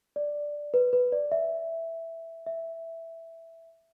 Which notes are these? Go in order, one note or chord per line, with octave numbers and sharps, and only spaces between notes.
D5
B4
B4
D5
E5
E5